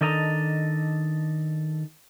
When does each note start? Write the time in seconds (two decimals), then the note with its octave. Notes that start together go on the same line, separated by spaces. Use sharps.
0.01 D#3 D4 A4 D#5 A#5